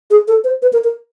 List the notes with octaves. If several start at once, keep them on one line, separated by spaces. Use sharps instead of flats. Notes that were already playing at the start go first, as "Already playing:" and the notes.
G#4
A4
C5
B4
A#4
A#4